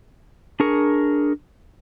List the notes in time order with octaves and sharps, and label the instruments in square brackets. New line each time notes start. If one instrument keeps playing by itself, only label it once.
[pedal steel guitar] D4 G#4 A#4 C#6